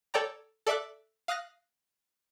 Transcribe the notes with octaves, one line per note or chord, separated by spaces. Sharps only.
A4 C#5 D5 G5 A#5
A4 D5 E5 D6 F#6
F5 D#6 F#6 A#6